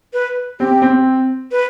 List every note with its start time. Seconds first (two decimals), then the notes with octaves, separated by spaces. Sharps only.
0.13 B4
0.60 C4 G4
0.82 C4
1.51 B4